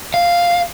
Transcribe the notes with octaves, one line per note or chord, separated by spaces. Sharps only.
F5